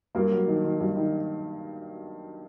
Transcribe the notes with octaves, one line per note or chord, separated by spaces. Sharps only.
G2 A#3 A#4
F#3
D#3
D#3
G2
D#3